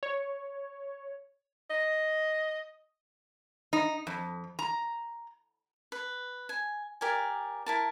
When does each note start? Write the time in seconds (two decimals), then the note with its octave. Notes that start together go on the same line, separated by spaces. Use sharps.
0.03 C#5
1.70 D#5
3.73 D#4
4.07 F2
4.59 A#5
5.92 B4
6.49 G#5
7.01 G4 A#4 D5 G#5
7.66 E4 A#4 A5